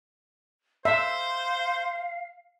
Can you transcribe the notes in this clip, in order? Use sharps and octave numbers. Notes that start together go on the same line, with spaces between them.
C5 E5 F5